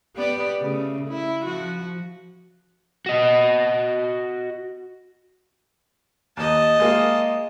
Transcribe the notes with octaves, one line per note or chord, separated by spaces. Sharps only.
B3 G4 D5
C#3 A3
E4
F3 F#4
F#4 D#5
D#2 D#5 A5
G#3 A#3 F4